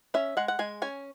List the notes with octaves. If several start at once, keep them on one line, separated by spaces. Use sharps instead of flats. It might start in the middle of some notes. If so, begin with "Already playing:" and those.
C#4 E5
G#3 F#5
F#5
G#3 G#5
C#4 G#5